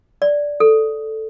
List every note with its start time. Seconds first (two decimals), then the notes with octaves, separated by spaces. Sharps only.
0.22 D5
0.60 A4